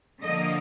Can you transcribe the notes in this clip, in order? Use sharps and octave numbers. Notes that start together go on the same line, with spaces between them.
D3 F3 A#3 D#5